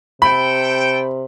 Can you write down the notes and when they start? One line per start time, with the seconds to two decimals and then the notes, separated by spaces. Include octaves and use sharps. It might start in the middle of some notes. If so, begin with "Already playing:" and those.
0.22 C3 A4 G5 B5